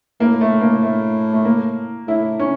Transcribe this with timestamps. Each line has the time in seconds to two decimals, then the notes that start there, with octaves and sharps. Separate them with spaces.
0.20 A2 A#3
0.41 A3
0.61 A#3
0.83 A3
1.33 A3
1.45 A#3
2.07 A2 E4
2.40 C#4